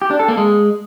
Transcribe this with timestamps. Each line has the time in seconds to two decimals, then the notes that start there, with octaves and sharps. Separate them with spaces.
0.02 G4
0.11 D4
0.19 A4
0.28 A#3
0.37 G#3